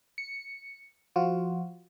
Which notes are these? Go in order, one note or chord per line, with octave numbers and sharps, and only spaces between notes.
C#7
F3 F4 F#4